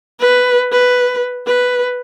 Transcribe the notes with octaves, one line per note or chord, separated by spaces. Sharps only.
B4
B4
B4